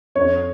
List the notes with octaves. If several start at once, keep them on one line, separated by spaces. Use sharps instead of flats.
F2 C#5